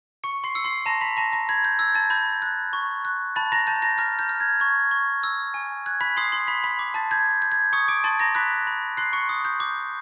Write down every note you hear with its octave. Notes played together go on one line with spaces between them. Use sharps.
C#6 C#7
C6 C7
E6 C#7
C6 C7
A5 A#5 A#6
B5 B6
A5 A#5 A#6
A#5 A#6
B5 G#6
G6
E6 G#6
A5 A6
B5 G6
F#6
C#6
F#6
A5 B5 A6
A#5 A#6
A5 G6 A6
A#5 A#6
A#5 F6 A#6
G6
F6
G#6
C#6 G#6
C#6
E6
G#5
F#6 G#6
B5 B6
C6 D#6 C7
C6 C7
B5 B6
B5 B6
D6
A5 A6
G6 G#6
G6
G#6
C#6 D#6 C#7
D6 D7
A5 C6 A6
A#5 A#6
B5 F#6 B6
B5
C6 F#6 C7
C#6 C#7
D#6
G6
D6